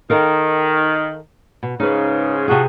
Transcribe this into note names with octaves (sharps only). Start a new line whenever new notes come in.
D#3 A4 A#4 F5
B2
G#2 C#3 D#4 B4
C3 F3 E4 F#4 G#4